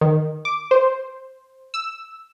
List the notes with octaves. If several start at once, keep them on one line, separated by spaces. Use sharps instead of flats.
D#3
D6
C5
E6